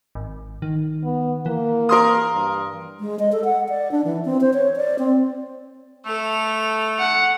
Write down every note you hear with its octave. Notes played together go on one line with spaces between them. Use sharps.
G#1
D#3
B3
E3 A#3
A#4 C6 D#6
G2
G#3
D#5
A4
F#5
D5
D4
E3
C4
C5
C#5
D5
C4
A3 A4 F7
F#5